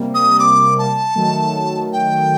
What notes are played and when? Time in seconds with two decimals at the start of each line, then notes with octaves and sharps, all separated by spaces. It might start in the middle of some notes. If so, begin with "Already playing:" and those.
Already playing: C3 G3 A#3
0.15 D#6
0.40 D6
0.79 A5
1.15 D#3 F#3 A3
1.93 G5